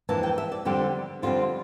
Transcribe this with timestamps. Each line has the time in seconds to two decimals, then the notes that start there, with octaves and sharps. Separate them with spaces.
0.09 F2 E3 A#3 D4 A5
0.23 G5
0.38 E5
0.52 D5
0.65 F2 D3 G3 C4 G4
1.22 F2 D3 G3 C4 F4